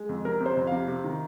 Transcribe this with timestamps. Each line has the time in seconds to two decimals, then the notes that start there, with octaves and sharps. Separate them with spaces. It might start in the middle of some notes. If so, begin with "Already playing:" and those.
Already playing: G#3
0.09 F2
0.24 C3 A#4
0.40 C3
0.46 C5
0.57 F2
0.67 C3 F5
0.88 C3
1.04 D#3